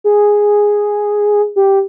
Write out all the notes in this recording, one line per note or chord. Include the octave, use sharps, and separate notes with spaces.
G#4
G4